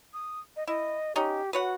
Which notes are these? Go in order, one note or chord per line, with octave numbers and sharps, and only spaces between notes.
D#6
D#5
E4 D#5
C#4 D#4 G4
F#4 B4 C#5 F#5